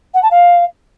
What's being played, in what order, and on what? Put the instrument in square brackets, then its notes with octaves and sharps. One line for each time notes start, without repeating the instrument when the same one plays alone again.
[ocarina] F#5
A5
F5